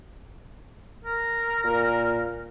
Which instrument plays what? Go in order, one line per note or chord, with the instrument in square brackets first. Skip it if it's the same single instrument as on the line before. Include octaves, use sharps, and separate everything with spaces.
[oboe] A#4
[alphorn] A#2